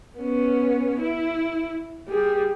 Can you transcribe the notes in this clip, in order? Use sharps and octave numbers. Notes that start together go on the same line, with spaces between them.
B3 C#4
E4
G3 G#4